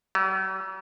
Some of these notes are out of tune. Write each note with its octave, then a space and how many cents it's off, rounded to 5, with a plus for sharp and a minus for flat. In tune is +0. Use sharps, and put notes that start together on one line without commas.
F#3 +45